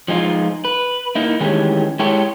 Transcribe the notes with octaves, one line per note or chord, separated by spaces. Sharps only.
F3 G#3 D#4 F4
B4
A#3 D#4 E4
D#3 E3 G#3 A3 C#4 G4
G#3 E4 G4 A4 C#5